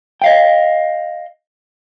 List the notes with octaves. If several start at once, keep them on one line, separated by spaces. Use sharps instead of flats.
D#5 F5 G5